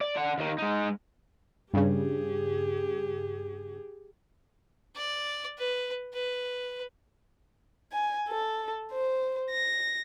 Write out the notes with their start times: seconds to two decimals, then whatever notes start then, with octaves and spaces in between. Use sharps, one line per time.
0.01 D5
0.16 D4 F#5
0.38 D#2 D#3
0.58 G#3 D#4
1.73 G2 C#3 G4 G#4
4.96 D5
5.58 B4
6.13 B4
7.92 G#5
8.29 A4
8.92 C5
9.51 A#6